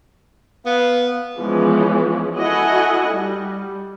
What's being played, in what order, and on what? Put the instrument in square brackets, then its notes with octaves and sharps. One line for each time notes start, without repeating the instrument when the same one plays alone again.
[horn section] B3 [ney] F5
[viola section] E3 F3 G#3 B3 C#4
E4 F#4 A4 D#5 F#5 G#5
G3